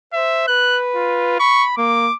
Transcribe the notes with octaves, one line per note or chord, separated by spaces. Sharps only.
C5 E5
B4 F#6
F4
B5 C#6
A#3 D6